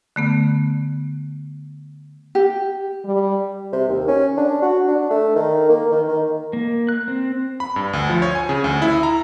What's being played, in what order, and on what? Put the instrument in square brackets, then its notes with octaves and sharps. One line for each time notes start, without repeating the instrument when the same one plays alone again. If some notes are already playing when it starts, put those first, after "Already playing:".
[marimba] D3 A3 B3
[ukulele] G4
[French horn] G3
[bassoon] C3
D#2
C#4
D4
F#4
D4
A3
D#3
A#3
D#3
D#3
[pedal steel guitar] A#3
F#6
C4
[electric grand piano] B5
G2
D2
F3
C#5
G#5
C#3
D2
E4
A#5